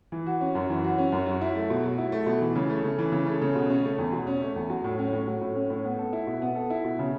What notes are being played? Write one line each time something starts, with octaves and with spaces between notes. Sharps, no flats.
E3
F#4
C#4
F#2
E3
F#4
C#4
F#2
F#3
E4
A3
B2
F#3
E4
A3
B2
E3
C#3
A3
C#3
E3
C#3
A3
C#3
B2
C#4
A3
E2
B2
C#4
A3
E2
F#3
A2
C#4
A2
F#3
A2
C#4
A2
B3
A4
E4
B2
B3
A4
E4
B2
C#3